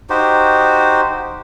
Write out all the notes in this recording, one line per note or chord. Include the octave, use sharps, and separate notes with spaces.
D#4 F#4 G4 C5